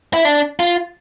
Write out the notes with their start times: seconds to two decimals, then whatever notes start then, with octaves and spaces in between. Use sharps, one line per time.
0.14 E4
0.25 D4
0.59 F4